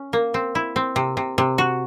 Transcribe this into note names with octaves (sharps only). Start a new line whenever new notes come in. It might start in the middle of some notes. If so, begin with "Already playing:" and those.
Already playing: C#4
A#3
C4
E4
C4
C3
C3
C3
F#4